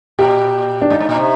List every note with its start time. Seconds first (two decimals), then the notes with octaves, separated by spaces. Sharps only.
0.19 A#2 G4
0.82 D4
0.90 G#2 D#4
1.00 G#2
1.09 A#2
1.17 C3